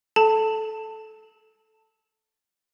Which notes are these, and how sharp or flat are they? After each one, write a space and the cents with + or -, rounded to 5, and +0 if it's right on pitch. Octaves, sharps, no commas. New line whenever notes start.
A4 -15 A5 +20